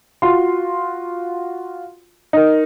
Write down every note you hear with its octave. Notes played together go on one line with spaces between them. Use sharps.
F4 F#4 C6
D#4 A#4